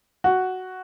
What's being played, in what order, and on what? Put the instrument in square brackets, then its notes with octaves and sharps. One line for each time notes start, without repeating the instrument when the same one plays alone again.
[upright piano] F#4